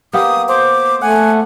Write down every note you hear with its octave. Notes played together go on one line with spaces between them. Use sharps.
A#3 B3 G4 D#6
C5 D6
A3 F#5 G#5